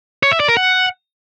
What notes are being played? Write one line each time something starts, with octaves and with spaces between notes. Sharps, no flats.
C#5
E5
D5
A#4
F#5